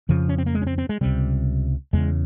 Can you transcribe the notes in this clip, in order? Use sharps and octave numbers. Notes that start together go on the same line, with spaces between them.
F2 C#3 F3
C#4
C4
A#3
G#3
C#4
C4
C4
G#3
C#2 C3 G3
E2 C#3 G#3